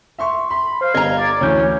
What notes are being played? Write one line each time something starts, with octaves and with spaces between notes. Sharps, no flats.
E5 C6 C#6
B5 C6
C5 F5
G1 D#5 A#5 G#6
D5
D2 E3 C#4 C#5 G6